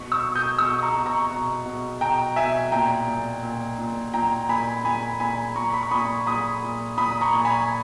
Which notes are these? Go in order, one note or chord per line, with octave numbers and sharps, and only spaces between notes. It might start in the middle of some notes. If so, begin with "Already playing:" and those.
Already playing: B2 C#6
C#6 E6
B2
D#6 G6
B2 C#6 E6
A#5 C#6
B2
A#5 C#6
B2
B2
B2 G5 A#5
B2 E5 G#5
A#2 G5 A#5
A#2
A#2
A#2
A#2 G5 A#5
A#2 G#5 B5
A#2 G#5 B5
A#2 G#5 B5
A#2 A#5 C#6
B5
C#6
A#2 B5 D#6
A#2 B5 D#6
A#2
A#2 B5 D#6
D#6
A#5 C#6
A#2
G#5 B5